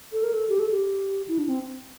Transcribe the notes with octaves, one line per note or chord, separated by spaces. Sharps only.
A4
A#4
A4
G4
A4
G4
E4
D4
C4